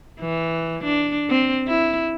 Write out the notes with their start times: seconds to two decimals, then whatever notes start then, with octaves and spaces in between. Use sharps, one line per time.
0.20 E3
0.84 D4
1.29 C4
1.67 E4